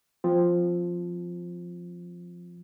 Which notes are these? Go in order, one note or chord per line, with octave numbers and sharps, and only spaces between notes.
F3 C4